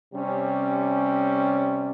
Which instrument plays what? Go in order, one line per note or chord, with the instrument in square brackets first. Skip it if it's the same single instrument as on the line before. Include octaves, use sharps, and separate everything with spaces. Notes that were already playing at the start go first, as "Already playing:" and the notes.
[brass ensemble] C3 G3 C#4